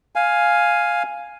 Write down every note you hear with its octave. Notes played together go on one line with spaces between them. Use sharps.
F5 G#5